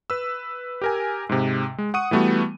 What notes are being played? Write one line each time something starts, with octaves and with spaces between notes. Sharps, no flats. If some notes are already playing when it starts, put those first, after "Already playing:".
B4 E6
G4 A#4 G#5
G#2 C3
G#3
F#5 C#6 D#6 D#7
E3 G3 A3 B3 F#4